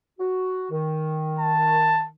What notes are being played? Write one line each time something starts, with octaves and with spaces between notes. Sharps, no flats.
F#4
D#3
A5